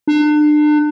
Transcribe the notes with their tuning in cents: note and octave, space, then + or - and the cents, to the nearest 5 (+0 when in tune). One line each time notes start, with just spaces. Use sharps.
D4 +35